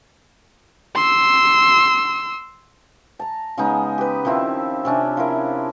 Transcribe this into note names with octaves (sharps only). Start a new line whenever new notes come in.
C6 E6
A5 A#5
C#3 G#3 B3 D#4
G4 B4
D#3 F3 C4 E4
C3 C#4 D4
F3 E4 A#4